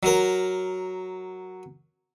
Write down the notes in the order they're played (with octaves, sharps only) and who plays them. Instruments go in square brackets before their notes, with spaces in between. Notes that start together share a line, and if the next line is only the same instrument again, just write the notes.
[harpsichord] F#3 A#4